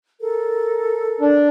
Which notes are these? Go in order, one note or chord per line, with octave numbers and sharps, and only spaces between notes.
A4 A#4
D4